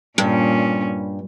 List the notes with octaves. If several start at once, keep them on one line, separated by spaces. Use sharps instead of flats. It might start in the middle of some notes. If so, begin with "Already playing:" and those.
G2 A#2 C#4